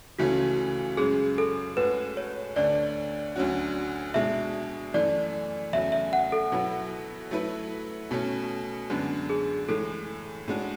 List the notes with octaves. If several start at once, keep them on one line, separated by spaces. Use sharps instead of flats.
C#2 C#3 E3 A3 C#4 F#4
F#2 C#3 G#3 G#4
A4
A2 G#3 C#4 F#4 B4
C#5
D2 D3 A3 D4 D5
D2 D3 F#3 C#4 F#4
B2 G#3 D4 E5
F#2 E3 A3 D5
E2 C#3 F#3 A3 E5
E5
F#5
A4
B2 F#3 B3 E4
F#3 A3 E4 B4
B2 A3 C#4
F#2 D3 G#3 B3 D4
G#4
A2 E3 G#3 A4
A2 G#3 D4 F#4